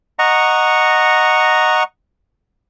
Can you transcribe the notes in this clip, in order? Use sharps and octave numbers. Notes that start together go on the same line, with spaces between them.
D#5 F#5 A#5 C#6